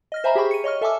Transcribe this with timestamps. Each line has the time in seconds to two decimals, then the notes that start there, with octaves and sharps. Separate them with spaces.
0.12 D#5 F6 A#6
0.24 C5 E5 G#5 A#5 B5
0.35 G4 G#4 G5 B5 C#6
0.51 C#7 D#7
0.64 C#5 D#5 C#6 F6
0.81 A4 E5 G#5 A5 D6 E6